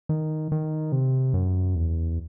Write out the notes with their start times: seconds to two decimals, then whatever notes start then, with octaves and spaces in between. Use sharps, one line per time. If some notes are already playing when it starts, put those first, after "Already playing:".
0.09 D#3
0.52 D#3
0.92 C3
1.34 F#2
1.75 E2